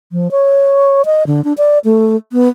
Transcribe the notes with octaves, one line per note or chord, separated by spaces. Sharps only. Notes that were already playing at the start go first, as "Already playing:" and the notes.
F3
C#5
D#5
D3
D4
D5
A3
B3